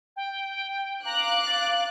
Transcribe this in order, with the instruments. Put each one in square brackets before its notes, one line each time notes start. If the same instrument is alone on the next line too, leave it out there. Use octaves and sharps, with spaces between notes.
[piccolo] G5
[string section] F5 D6 F#6 [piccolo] A#5
[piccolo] A6